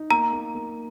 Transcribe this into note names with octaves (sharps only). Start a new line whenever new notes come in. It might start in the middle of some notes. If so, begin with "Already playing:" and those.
Already playing: D#4
A#3 A#5
A#3
A#3